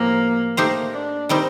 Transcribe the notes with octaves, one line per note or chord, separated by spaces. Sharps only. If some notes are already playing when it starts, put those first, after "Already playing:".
Already playing: A2 F3 A#3 C4 G4
A3 A#3 D#4 G4 C5
D4
D#3 G3 C4 D#4